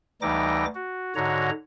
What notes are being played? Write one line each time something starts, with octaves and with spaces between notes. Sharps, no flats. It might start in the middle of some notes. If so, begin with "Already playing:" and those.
D2 E3 G3 D#4 D6 A#6
F#4
G#2 D3 F#4 C#5 A#5